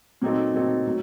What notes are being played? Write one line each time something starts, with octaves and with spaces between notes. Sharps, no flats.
A#2 F#3 C4 D#4 A4
A#2 F#3 C4 D#4 A4
A2 F#3